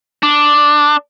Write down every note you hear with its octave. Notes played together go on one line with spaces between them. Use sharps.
D4